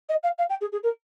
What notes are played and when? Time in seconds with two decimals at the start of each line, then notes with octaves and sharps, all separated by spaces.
0.09 D#5
0.23 F5
0.38 F5
0.49 G5
0.61 G#4
0.72 G#4
0.83 A#4